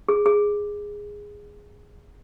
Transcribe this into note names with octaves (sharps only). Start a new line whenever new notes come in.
G#4
G#4